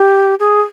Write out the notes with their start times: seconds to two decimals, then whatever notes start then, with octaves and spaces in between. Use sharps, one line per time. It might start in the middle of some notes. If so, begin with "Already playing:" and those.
Already playing: G4
0.40 G#4